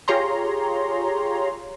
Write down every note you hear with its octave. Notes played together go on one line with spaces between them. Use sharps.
F4 G4 G#4 C#5 A#5 C6